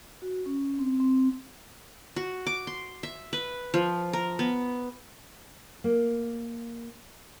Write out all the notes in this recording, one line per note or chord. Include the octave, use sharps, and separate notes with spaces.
F#4
C#4
C4
C4
F#4
D6
C6
E5
B4
F3
A#4
B3
A#3